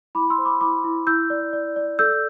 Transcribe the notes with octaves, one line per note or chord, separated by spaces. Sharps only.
E4 B5 D6
C6 E6
C5
B5 D6
E4 B5 D6
E4
E4 E6 G6
D5
D5
D5
A4 E6 G6